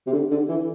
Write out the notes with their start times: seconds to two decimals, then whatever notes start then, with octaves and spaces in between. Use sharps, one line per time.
0.07 C3
0.13 D3
0.31 D3
0.49 E3